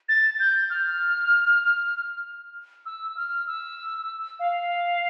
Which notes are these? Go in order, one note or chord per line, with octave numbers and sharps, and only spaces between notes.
A6
G6
F6
E6
F6
E6
F5